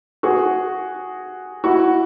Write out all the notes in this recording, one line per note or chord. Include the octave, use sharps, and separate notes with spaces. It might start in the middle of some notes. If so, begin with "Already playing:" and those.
F#4 G#4
E4 F#4